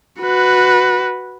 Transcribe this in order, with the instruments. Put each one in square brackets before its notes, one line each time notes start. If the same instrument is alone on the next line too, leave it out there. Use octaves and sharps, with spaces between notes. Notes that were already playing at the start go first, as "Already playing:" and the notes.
[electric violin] F#4 B4